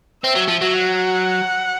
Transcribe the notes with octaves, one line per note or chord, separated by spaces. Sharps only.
C4 E5
F#3
F3
F#3
F#5